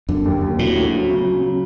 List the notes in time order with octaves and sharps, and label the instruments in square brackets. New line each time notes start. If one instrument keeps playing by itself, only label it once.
[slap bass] F#2 [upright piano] D3
[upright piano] D#2
D#2
[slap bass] A2 [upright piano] F#3
[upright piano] D2
F#3
C#3
F#3
C#3